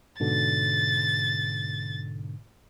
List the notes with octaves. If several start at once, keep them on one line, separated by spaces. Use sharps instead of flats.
G#2 B2 D3 A6